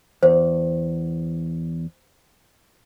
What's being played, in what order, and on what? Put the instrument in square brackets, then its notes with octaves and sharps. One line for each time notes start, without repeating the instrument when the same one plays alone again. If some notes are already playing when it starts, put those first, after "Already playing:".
[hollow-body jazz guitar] E2 [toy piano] C5